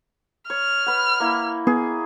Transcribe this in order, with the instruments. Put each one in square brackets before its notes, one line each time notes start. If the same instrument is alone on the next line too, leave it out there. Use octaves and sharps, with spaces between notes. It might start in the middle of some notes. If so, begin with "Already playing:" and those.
[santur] C#5 [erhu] F6
[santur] B4 F#5
A#3 E4
[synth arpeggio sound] B3 [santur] G#4